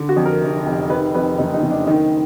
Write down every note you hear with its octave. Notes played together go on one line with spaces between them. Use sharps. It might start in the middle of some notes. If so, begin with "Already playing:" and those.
Already playing: D3
F#4
F2
A#4
F1
F1
D#3 B4
F2 B4
F#1 D#4
D#4
F#1
D4
D#3 D#4